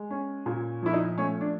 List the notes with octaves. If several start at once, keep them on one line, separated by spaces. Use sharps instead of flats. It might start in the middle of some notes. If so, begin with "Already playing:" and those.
Already playing: G#3
C#4
A#2
F3 E4
D#4
A3 C#4
D4